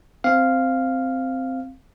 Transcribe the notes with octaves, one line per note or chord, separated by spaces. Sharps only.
C4 F5